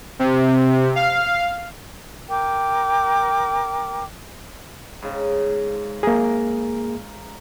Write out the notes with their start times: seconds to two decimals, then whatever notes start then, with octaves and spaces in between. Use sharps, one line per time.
0.19 C3
0.96 F5
2.29 A#4 G5 D6
5.02 G#2 C#3
6.03 A#3 G#4 A#4